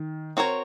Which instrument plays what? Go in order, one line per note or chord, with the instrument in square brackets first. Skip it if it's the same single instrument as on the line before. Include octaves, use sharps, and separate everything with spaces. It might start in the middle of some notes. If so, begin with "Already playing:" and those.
Already playing: [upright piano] D#3
[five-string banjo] C4 F#4 A#4 C#5